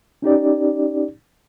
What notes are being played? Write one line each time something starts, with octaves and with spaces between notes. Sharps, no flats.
C#4 D#4 G4 D5